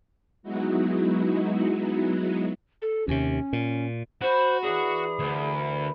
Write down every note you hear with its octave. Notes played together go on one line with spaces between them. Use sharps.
F#3 G#3 B3 D#4 E4 F#4
A4
D#2 C3 C#4
A#2
F#4 C5 B5
E3 G#4 D5 A#5
D2
A#4 B4